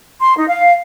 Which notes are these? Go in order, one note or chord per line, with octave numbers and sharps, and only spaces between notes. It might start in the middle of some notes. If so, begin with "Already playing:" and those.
C6
D#4
F5